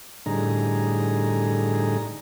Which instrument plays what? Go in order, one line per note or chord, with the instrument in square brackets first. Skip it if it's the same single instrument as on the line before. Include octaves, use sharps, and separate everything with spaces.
[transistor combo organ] A2 D3 G3 D#4 G#4 A#5